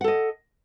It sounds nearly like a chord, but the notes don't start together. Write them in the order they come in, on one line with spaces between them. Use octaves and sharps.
F#5 A4 D#5